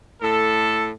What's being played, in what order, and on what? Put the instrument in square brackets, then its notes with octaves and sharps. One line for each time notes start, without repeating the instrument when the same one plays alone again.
[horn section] A2 A4